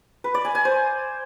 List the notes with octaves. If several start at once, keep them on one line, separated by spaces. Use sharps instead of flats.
B4
D5
G#5
G#5
C5